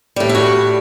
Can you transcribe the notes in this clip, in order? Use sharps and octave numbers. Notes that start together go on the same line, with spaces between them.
A2 G3
E4
F#4